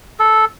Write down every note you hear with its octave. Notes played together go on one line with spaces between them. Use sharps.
A4